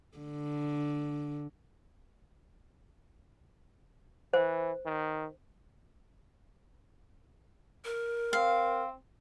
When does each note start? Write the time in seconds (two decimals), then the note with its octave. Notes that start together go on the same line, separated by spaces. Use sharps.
0.18 D3
4.33 E3 C5
4.85 D#3
7.85 A#4
8.33 C4 F5